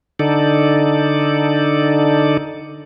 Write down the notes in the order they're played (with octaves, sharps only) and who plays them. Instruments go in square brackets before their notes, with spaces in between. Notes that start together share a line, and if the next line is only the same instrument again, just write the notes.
[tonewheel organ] D3 D#4 A4 D5